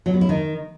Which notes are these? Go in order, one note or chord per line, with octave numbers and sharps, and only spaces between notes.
F#3
B3
E4
D#3